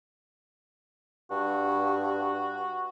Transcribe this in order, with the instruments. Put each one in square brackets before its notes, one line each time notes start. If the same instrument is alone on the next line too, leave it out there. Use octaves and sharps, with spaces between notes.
[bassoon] G2 [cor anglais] F#4